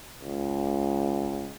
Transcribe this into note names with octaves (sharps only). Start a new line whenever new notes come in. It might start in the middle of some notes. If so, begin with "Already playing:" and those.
C#2